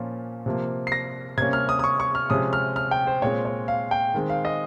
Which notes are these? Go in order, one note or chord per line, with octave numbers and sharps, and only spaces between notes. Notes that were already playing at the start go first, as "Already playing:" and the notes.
Already playing: A#2 F3 A#3 C#4
C3 F3 A#3
C7
A#6
C3 G3 A#3 C#4 G#6
F6
D#6
D#6
C#6
C#6
F6
C3 F3 G#3 C#4 D#6
F6
F6
G5
C5
A#2 G#3 C4 C#5
C#5
F5
G5
D#3 G#3 C4
F5
D#5